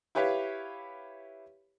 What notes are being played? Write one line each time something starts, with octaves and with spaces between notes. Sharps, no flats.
E4 G4 B4 C#5 F5